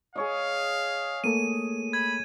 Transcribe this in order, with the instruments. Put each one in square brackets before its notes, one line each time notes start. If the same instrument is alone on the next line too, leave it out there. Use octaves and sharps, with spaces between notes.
[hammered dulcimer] G#4 C#5 D#5 [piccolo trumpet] F5
[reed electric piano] A3 A#3 A4 [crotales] D#7
[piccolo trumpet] B5 [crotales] G#6